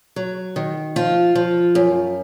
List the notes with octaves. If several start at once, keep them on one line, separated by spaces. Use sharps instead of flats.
F#3
D#3
F3 F4
F3
F#2